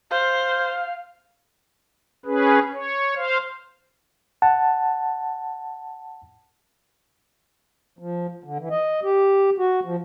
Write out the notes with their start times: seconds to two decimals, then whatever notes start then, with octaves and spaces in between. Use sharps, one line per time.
0.11 C5 F5
2.26 C#4 G#4 B4
2.73 C#5
3.16 C5 F5
4.42 F#5 A5
7.99 F3
8.44 D3
8.59 E3
8.70 D#5
9.03 G4
9.58 F#4
9.84 F3